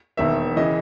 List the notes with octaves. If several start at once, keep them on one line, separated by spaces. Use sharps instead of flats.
E1 E2 D#3 A#3 E5
C#3 E3 D#5